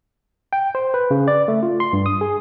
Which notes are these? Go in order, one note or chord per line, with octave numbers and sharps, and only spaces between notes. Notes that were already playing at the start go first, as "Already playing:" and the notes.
G5
C5
B4
C#3
D5
A3
F4
C6
G2
D#6
G#4